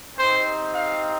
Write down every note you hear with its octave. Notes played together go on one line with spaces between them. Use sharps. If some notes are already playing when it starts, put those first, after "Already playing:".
C4 D#4 G4 C5
F5